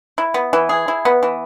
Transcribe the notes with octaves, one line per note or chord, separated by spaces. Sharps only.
E4
B3
E3
G#4
E4
B3
E3